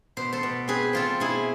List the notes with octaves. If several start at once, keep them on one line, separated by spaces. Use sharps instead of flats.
B2 C5
A4 C5
B2
C4 G#4 B4
C4 F4 A4
B2 E4 G#4